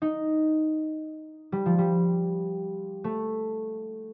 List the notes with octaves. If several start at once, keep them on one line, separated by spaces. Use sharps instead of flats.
D#4
G3
F3
G3
A3